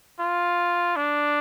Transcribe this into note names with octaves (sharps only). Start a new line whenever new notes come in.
F4
D4